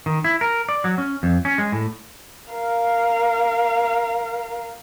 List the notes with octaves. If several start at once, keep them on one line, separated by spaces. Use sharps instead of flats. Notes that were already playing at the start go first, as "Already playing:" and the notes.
D#3
E4
A#4
D5
F#3
C#4
F2
C#4
G#3
A2
A#4 F5